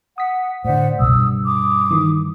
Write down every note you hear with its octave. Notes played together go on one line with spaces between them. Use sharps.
F#5 D#6 B6
A2 D3 C5 D5 F#5
F#1 C2 B2 D#6 E6
G2
D6 D#6
D#3 E3